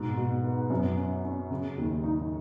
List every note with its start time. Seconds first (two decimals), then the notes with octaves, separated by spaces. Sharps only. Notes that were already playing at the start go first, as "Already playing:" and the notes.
Already playing: G#2 B2
0.17 B2
0.44 B3
0.70 F#2
0.98 C#4
1.24 C#4
1.51 C#3
1.78 D#2
2.04 D#4